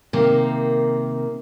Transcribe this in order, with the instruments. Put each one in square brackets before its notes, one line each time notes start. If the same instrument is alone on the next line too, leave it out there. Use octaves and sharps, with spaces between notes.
[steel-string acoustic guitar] C3 D#3 A#3